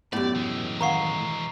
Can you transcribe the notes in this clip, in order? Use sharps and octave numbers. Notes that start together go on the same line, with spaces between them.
F#2 A2 B3 G4 D5
E3 G#3
D#3 F5 F#5 A#5 C#6 C7